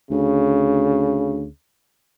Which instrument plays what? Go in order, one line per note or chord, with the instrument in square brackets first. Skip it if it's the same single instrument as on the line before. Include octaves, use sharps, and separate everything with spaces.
[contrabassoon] D2 [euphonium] C#3